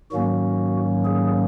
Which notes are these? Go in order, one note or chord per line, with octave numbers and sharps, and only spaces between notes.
G#2 D#3 F#3 A#3 C#4 F#4
G#4